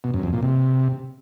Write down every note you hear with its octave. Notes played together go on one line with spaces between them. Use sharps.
B2
F#2
F2
A#2
C3